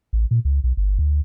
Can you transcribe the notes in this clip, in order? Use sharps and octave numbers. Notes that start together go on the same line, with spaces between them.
A1
A#2
C#2
B1
G1
D2